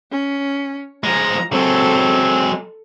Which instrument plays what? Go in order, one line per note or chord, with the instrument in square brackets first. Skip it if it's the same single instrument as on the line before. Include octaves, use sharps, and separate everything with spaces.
[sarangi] C#4
[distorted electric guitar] F3 G#3 [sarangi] A#5
[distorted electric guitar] F#3 G#3 [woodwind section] C4 [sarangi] A4